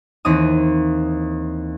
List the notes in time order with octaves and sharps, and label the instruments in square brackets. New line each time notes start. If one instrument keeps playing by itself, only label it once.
[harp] D#2 E3 C4 D#4 D#6